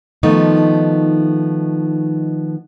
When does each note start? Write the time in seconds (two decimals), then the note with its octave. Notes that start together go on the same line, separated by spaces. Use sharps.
0.23 D#3 F3 A3 B3 D#4